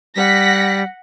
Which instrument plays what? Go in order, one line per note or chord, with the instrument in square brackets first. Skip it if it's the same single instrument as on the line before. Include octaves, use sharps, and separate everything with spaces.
[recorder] G3 [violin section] F#5 A#6 B6